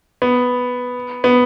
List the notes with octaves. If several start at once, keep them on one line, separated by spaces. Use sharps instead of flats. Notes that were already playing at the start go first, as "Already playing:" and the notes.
B3
B3